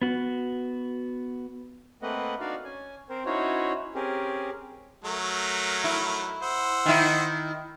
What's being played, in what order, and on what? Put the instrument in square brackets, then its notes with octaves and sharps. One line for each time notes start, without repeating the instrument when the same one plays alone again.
[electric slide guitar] B3 F#4
[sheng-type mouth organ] A3 A#3 C4 B4 D#5 F#5
D4 D#4 F#4 D5 F5
C#4 G#5
C4 A#4 C5
C#4 D#4 E4 F#4 C5 C#5
C4 C#4 G4 G#4 A#4
[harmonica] F#3 A3 A#4
[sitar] E4
[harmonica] C5 F#5 E6
[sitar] D#3 E4